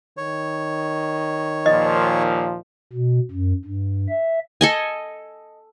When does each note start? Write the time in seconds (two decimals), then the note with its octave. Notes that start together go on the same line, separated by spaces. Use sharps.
0.17 D#3 C#5
1.66 D#2 A#2 F3 D#5
2.93 B2
3.31 F#2
3.65 G2
4.09 E5
4.61 A4 D#5 G#5